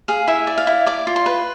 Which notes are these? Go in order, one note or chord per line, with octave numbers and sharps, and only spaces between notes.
G#4 F5
E4 E5
D5
F5
E4
D5 D6
F4
C6
B4